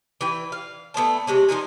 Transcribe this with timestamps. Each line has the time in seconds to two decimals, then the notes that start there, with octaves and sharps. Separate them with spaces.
0.21 E3 B4 G5
0.52 F5
0.94 A3 B3 C5 A5
1.27 C3 G#3 C#4
1.48 F3 D#4 A#4 G#5